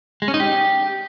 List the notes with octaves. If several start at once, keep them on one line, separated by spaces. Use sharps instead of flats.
G#3
C#4
D#4
G4